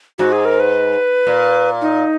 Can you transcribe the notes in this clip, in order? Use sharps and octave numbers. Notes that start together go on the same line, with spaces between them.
G#2 F#4
G#4
A#4
B4
A#2
D#4